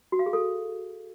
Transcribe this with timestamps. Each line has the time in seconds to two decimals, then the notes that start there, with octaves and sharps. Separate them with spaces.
0.12 F#4
0.19 F5
0.26 G#4
0.33 A4